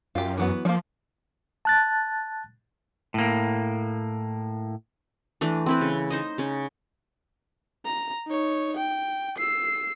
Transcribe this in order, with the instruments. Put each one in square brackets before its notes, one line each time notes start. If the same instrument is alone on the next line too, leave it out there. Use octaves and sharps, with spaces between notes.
[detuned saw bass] F#2 [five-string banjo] F4 G4
[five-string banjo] E3 F#3 B3
[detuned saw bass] F3 [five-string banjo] G3 A#3
[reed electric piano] A5 F#6 A6
[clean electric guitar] A2 A#3
[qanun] E3 A3 D4
C4 E4 B4
C#3
D#4 C5 D#5
C#3 C#4
[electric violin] A#5
D#4 C#5
G5
E6 C7